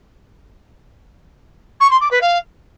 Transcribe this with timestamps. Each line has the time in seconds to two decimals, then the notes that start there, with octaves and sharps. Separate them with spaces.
1.80 C#6
1.90 C6
2.00 D6
2.10 B4
2.21 F5